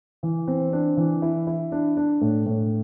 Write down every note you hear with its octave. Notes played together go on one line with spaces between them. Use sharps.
E3
C4
D4
E3
E4
E4
D4
D4
A2
A2